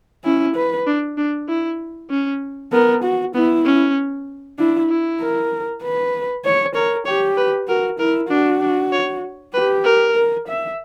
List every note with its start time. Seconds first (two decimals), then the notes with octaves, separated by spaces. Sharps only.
0.24 C#4 E4
0.56 B4
0.86 D4
1.18 D4
1.49 E4
2.10 C#4
2.72 B3 A#4
3.03 F#4
3.35 B3 E4
3.65 C#4
4.58 D4 E4
4.89 E4
5.21 A#4
5.83 B4
6.45 C#5
6.75 A#4 C#5
7.06 G4 C#5
7.37 B4
7.68 F#4 A#4
7.99 E4 A#4
8.30 D4 F#4
8.61 D4
8.92 C#5
9.54 G4 B4
9.84 A#4
10.15 A#4
10.48 E5